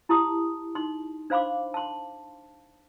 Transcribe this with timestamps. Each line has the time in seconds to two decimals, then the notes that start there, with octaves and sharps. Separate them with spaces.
0.09 E4 G4 A5 C6 D#6
0.75 D#4 C6
1.30 D4 C5 F5 B5 C6 D6
1.74 A5 C6